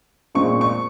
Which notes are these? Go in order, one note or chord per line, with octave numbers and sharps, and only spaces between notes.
A#2 G#3 C4 C#6
C#6